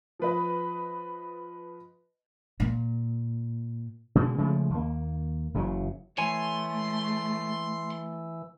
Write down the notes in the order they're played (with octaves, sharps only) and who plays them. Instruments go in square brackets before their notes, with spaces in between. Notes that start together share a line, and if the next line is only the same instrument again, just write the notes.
[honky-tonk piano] F3 B4 D#5
[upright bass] A#2
[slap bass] B2 D3 G#3
C#3 F3 G#3 A3
D#2 A#3
F#1 C#3 E3 F#3
[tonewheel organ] E3 [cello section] A3 [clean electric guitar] C#5 G#5 [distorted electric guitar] C6